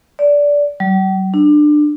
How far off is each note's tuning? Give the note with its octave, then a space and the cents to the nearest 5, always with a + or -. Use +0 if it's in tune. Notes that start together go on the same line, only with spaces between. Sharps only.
D5 -15
G3 -45
D4 +25